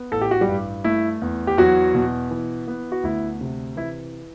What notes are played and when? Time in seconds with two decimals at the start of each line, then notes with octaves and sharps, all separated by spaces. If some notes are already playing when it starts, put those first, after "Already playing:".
Already playing: B3
0.11 A1 A4
0.21 G4
0.31 F#4
0.41 G3 G4
0.48 G2
0.84 A3 E4
1.22 E2
1.47 G4
1.57 E2 F#3 F#4
1.95 B2
2.31 E3
2.68 B3
2.92 F#4
3.03 D2 E4
3.41 C3
3.77 E3 E4